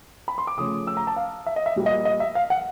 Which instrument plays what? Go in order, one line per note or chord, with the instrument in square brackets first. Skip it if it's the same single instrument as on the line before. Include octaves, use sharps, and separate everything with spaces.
[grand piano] B5
C6
D6
C#3 F3 A3 C#4 D#6
E6
A#5
A5
F5
E5
D#5
E5
A#2 G3 A#3
D#5
D#5
E5
F5
F#5